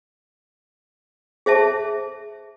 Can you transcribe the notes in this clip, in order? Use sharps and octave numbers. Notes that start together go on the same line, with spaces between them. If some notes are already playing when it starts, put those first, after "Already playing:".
G#4 C5 E5 A5